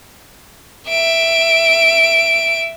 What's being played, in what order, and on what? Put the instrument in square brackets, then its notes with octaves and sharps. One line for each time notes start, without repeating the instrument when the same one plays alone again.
[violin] E5 D7